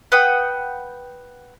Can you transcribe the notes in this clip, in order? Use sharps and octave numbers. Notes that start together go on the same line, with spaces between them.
B4 F#5 G5 D#6